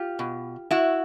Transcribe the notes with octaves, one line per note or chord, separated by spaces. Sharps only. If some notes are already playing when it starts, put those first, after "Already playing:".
Already playing: F4 G4
B2
E4 F#4